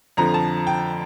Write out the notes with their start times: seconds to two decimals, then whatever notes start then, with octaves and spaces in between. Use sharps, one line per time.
0.17 F2 D3 F3 A#5
0.34 A5
0.67 G5